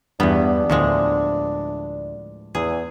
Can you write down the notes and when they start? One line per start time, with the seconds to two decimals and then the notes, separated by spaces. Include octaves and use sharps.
0.20 E2 G2 B3 D4
0.70 D2 A2 F3 G#3
2.55 E2 G#4